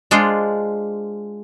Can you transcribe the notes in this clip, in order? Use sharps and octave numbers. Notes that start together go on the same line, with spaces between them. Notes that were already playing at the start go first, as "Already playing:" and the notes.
G#3 D4 F4 C5